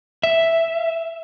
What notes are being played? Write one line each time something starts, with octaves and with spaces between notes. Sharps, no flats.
E5